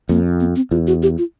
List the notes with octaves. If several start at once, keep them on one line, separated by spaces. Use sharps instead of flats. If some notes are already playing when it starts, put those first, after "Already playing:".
F2 A#3
B3
C4
E2 F4
F#4
G4
F4